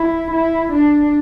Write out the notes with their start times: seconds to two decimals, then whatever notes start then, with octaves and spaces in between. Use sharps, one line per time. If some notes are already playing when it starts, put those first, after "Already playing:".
Already playing: E4
0.31 E4
0.72 D4